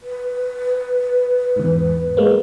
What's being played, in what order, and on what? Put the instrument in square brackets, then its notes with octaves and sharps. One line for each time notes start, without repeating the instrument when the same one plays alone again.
[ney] B4
[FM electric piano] E2 G#2
G#3 A#3 B3